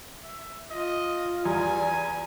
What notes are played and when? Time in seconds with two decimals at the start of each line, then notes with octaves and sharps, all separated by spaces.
0.24 E5
0.70 F4 D#5
1.46 E2 G3 G#5